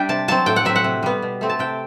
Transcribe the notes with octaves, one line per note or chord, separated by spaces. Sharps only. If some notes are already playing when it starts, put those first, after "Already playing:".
Already playing: G3 D4 E5 G5
C3 A5
F#3 C4 A5
A2 G5
F#5
F#3 C4 E5
F#5
C3
G3 B3
B2
A3 C4
A5
C3 G5